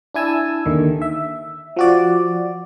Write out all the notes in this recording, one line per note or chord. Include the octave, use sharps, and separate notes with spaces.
D4 E4 G#5 A5 E6
D#2 D3 D#3
E5
F3 F#4 D5